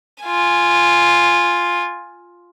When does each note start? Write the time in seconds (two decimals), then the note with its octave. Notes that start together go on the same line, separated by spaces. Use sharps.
0.24 F4 G#5